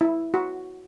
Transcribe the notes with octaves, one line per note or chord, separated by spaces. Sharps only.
E4
F#4